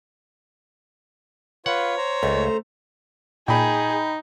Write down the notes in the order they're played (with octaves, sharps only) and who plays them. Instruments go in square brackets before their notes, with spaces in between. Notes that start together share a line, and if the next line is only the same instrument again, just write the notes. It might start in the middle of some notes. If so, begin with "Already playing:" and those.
[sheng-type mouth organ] F4 B4 [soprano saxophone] C#5 [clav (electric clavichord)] F#5
[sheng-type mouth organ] C5 A#5
[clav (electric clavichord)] C#2 [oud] A3 C#4
[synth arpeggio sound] A#2 [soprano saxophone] D#4 [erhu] G#4 [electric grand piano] G5 B5